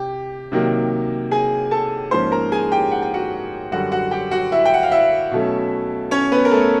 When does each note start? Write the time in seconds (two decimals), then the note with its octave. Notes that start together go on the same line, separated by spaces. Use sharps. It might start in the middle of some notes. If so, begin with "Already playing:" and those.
Already playing: C3 G4
0.52 C3 D#3 F#3 A#3
1.31 G#4 G#5
1.71 A4 A5
2.11 G#2 F3 A#3 C#4 C5 C6
2.32 A#4 A#5
2.52 G#4 G#5
2.72 G4 G5
2.91 F#5
3.02 G5
3.14 F#4 F#5
3.72 F#2 D3 G3 F#4 F#5
3.92 F#4 F#5
4.11 G4 G5
4.31 F#4 F#5
4.52 E4 E5
4.65 G5
4.74 F#5
4.83 F5
4.91 E4 E5
5.31 B2 F#3 A3 C#4
6.11 C#4 C#5
6.32 B3 B4
6.45 A#4
6.51 A3 A4